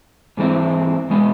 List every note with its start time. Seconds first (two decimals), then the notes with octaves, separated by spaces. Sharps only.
0.37 G#2 E3 G#3 C4 E4
1.10 B2 G#3 B3